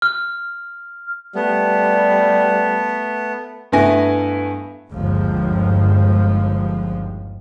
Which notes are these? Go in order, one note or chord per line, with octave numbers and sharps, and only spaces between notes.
F6
G3 A3 B3
G2 A3 B3 E4 G#5 A#6
G1 D#2 F3 G#3